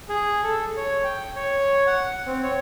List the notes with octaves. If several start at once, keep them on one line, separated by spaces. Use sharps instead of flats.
G#4
A4
C#5
G5
C#5
F#5
C4
C#5